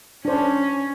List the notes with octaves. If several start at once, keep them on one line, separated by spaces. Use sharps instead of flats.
C#4 D4 C5